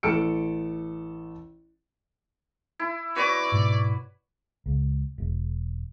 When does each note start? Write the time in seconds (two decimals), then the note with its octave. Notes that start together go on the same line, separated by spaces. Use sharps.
0.03 A1 A4 E6 C#7 D7
2.79 E4
3.16 F#4 B4 C#5 D5
3.52 G#2 B2
4.66 C#2
5.18 E1